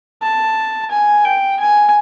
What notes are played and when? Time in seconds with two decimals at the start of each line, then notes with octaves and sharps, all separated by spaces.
0.22 A5
0.91 G#5
1.25 G5
1.60 G#5